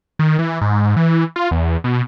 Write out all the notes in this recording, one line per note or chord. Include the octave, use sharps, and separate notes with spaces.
D#3
E3
G#2
E3
F4
E2
B2